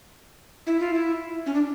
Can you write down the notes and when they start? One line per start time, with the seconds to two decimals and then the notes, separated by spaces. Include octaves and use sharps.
0.67 E4
0.80 F4
0.93 E4
1.46 C#4
1.54 D4